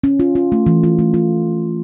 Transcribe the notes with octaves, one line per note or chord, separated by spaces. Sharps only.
C#4
F4
F4
A3
E3
F4
A3
F4